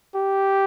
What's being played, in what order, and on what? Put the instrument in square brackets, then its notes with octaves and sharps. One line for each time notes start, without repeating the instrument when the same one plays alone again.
[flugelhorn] G4